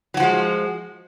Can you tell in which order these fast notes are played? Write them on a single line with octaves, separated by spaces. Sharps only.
F#3 F#4 F3 G#3